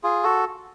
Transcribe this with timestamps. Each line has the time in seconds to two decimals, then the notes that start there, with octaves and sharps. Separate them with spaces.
0.03 F4 G#4
0.24 F#4 A4